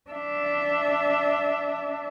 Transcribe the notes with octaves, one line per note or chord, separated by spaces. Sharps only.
D4 E5